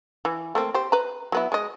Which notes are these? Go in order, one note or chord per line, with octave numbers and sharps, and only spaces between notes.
E3
A3 A#3 C4
G4 C5
B4 A#5
F#3 B3 E4
G#3 D#5